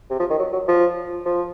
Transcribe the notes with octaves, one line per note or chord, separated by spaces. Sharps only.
C3
F3
D#3
F#3
F#3
F3
F3